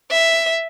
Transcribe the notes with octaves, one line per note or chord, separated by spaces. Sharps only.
E5